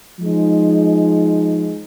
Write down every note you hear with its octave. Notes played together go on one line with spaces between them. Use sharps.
F3 G#3 D#4